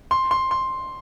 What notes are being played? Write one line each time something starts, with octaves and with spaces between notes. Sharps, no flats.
C6
C6
C6